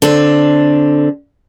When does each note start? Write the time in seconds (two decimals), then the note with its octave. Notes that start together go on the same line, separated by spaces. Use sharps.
0.02 D3 C4 D4